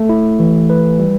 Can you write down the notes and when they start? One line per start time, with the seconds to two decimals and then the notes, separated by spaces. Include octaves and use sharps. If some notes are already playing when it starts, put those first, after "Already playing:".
Already playing: A3
0.09 E4
0.40 E3
0.70 B4
0.99 G3